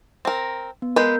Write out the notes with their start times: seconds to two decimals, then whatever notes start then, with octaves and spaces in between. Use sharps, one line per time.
0.25 C4 A#4
0.82 B3
0.96 G#3 A#4 B4 G6